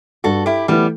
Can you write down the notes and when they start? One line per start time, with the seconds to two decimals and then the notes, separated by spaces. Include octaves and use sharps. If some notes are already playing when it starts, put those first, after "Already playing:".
0.24 G2 F#4 A4
0.46 E4 G4
0.68 E3 G3 A3 B3 E4